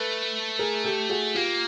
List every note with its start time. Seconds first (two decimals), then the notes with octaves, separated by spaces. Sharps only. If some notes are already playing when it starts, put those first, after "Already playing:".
Already playing: A3 A4 B4
0.59 G#4 A#4
0.84 G4 A4
1.10 F#4 G#4
1.35 A#3 F4 G4